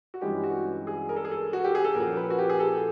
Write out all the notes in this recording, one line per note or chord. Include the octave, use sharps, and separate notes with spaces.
F#4
G2 E3 G#3 C#4 G4
F#4
G#4
A#4
A4
G#4
A4
F#4
G4
G#4
A4
A#2 F3 A#3 C#4 A#4
B4
F#4
G4
G#4
A4